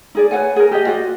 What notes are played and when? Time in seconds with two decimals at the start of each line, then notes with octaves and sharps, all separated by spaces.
0.15 D#4 G#4 D5
0.31 B4 C#5 F#5 G#5
0.56 G#4 A#4
0.71 G4 G#4 D#5
0.86 F4 F#4 D5 D#5